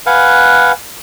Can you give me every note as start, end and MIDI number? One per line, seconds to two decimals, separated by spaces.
0.06 0.72 71
0.06 0.72 77
0.06 0.72 78
0.06 0.72 80